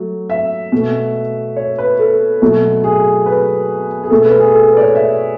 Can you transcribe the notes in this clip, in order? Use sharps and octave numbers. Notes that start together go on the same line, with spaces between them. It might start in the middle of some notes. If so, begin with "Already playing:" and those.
Already playing: F#3 A3
E5
B2 A3
C#5
B4
A4
B2 F#3 A3
G#4
B4
G#4
B2 A3 A4
B4
G#4
A4
B4
D5
C#5
E5